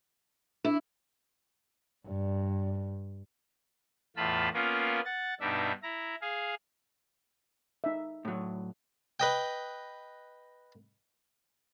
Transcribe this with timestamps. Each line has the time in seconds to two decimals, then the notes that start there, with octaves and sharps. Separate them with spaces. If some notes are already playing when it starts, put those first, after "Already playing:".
0.64 D4 E4
2.08 G2
4.16 E2 A2 F4 A5 B5
4.54 A#3 B3 C#4 F4 A#4
5.05 F#5 A6
5.40 G2 B2 D4 D#4 E5
5.83 E4 A#5
6.21 G#4 F5
7.84 D#4 E5
8.25 A2 F#3
9.20 B4 D#5 G5